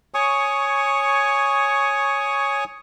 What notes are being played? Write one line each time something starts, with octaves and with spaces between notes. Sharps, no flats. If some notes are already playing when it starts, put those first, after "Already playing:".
C#5 G#5 C#6 D#6